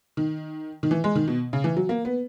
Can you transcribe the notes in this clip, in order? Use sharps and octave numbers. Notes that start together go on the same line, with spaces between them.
D#3
D#3
E3
G#3
D#3
B2
C#3
E3
F#3
A#3
B3